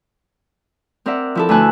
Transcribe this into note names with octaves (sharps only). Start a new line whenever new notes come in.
C4 A#4 D5 E5 F#5
F3 E4 A4
D2 B4 G#5 A5 F#6